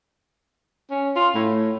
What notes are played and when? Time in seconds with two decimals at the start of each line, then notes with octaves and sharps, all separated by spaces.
0.90 C#4
1.16 F4
1.35 A2